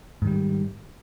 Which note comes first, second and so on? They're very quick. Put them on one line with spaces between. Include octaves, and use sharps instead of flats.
G#2 D#3 G3